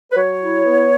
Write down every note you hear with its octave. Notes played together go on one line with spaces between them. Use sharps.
B4
F#3 C#5
E4
B3